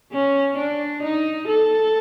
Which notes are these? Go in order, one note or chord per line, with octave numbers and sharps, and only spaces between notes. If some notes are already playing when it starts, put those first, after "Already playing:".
C#4
D4
D#4
A4